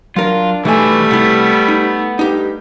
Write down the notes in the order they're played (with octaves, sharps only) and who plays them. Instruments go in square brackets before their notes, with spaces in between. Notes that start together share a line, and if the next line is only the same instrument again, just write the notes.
[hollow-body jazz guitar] F#3 A#4 [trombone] D4 [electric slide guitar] F4
[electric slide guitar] B2 E3 [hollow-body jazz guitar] D#3 G#5 [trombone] G3 [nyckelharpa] A3
[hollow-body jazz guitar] C2 E4 [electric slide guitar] B3
[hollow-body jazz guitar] D#4
[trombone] G2 [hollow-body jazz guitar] D#4 G4